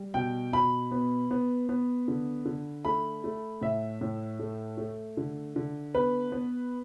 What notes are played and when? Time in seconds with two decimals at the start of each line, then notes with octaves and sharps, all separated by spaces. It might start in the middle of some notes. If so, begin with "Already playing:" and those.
Already playing: G3
0.14 B2 G5
0.52 B2 B5
0.91 B3
1.31 B3
1.69 B3
2.08 D3
2.45 D3
2.85 A3 B5
3.24 A3
3.61 A2 E5
4.01 A2
4.39 A3
4.78 A3
5.17 D3
5.56 D3
5.94 B3 B4
6.32 B3